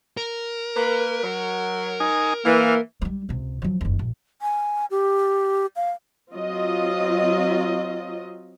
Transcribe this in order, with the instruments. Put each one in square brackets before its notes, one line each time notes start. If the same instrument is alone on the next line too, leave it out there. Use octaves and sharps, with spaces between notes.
[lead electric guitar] A#4
[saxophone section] A#3 B4
F#3
[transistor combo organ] D#4 G#5
[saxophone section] E3 [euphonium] A#3 [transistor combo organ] F5
[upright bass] F#3 G3
C#2 C3
F3 F#3
F#1 D#2
A#1
[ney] G#5
G4
F5
[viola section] F#3 C4 F4 D#5